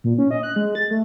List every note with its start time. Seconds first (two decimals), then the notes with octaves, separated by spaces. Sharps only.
0.04 A#2
0.18 C#4
0.31 D#5
0.43 F#6
0.56 G#3
0.75 A6
0.91 A3